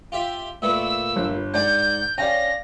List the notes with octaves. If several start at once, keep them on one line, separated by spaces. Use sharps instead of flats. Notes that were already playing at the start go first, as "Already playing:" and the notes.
F4 G4 E5
A#2 A3 B3 E6
G1
G#2 D5 F#5 G6
C#4 D5 F5 G5 A#6